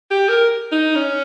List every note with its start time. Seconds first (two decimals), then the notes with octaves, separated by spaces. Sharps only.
0.11 G4
0.29 A#4
0.72 D#4
0.95 C#4